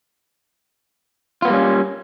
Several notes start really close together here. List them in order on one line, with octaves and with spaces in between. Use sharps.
F4 B3 A#3 G3 C#4